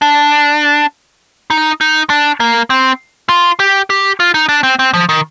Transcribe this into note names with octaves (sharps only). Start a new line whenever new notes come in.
D4
D#4
D#4
D4
A#3
C4
F4
G4
G4
F4
D#4
D4
C4
C4
F3
D#3